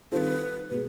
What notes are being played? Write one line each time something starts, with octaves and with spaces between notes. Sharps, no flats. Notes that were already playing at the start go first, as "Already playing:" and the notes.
D#3 G3 C4 F4 A4 B4 C5
B2 G#3 B4